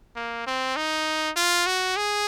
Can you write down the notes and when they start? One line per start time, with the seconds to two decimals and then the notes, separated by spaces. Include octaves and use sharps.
0.16 A#3
0.47 C4
0.76 D#4
1.36 F4
1.66 F#4
1.97 G#4